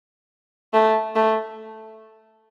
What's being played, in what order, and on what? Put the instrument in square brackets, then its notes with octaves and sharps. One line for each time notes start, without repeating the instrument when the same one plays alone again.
[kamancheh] A3
A3